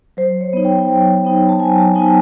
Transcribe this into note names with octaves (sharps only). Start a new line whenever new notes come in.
F#3 C5
C#5
B3 D#4
G5
F#3 G5
B3 D#4
A5
F#3 G#5
A5
B3 D#4 G#5